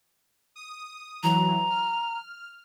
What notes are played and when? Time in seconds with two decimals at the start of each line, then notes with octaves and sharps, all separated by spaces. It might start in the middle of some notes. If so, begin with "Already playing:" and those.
0.56 D#6
1.23 E3 F#3 A#5
1.70 F6